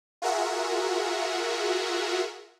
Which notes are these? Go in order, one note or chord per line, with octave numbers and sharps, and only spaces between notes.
F4 F#4 G#4 A#4 E5 F#5